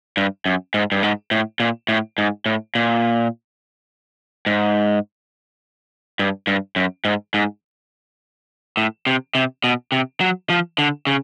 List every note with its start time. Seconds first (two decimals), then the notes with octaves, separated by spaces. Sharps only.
0.17 G2
0.46 F#2
0.74 G#2
0.92 G2
1.03 G#2
1.31 A2
1.60 A#2
1.88 A2
2.18 G#2
2.46 A2
2.75 A#2
4.46 G#2
6.19 G2
6.47 G2
6.76 F#2
7.05 G#2
7.34 G#2
8.77 A2
9.06 C3
9.35 C3
9.64 B2
9.92 C3
10.20 F#3
10.50 F3
10.78 D3
11.07 C#3